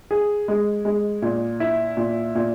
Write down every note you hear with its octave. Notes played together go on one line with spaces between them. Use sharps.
G#4
G#3
G#3
A#2
E4
A#2
A#2